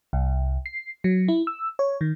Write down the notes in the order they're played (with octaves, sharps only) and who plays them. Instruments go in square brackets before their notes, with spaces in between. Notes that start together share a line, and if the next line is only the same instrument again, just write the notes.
[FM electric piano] C2
C7
F#3
E4
E6
C#5
D#3